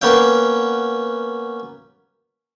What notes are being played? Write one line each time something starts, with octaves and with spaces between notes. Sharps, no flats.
A#3 B3 C#4 F5 G5